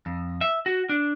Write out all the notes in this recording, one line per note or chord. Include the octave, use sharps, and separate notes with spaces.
F2
E5
F#4
D4